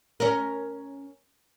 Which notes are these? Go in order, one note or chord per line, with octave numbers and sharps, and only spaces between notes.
C#4 A#4